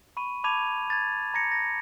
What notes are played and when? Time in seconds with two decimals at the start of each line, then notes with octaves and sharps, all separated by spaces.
0.17 B5 C#6 D#7
0.44 A5 B5 D6 G#6 D#7 F7
0.90 G#6 A6
1.34 A#5 G#6 A#6 C#7
1.52 A#6